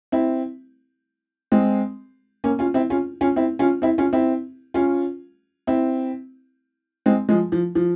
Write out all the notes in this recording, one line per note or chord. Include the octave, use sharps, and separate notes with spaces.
C4 E4
G#3 C4
A#3 C#4
C#4 F4
C4 E4
C#4 F4
C#4 F4
C4 E4
C#4 F4
C4 E4
C#4 F4
C4 E4
C#4 F4
C4 E4
G#3 C4
F3 G#3
F3
F3